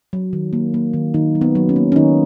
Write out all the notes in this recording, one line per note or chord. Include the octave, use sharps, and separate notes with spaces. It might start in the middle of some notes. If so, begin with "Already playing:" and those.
F#3
D#3
A#3
A#3
D#3
D#3 D#4
F#3
B3
F#3
C#4
A#3
C#4
D#3 D#4